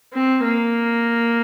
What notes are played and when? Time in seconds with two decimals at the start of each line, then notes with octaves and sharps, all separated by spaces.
0.13 C4
0.44 A#3